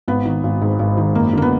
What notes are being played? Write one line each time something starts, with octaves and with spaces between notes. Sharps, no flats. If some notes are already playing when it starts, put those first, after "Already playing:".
G#1 B3
D#3
G#1
G#2
G#1
D#3
F#1 A#3
D3 A#3
B3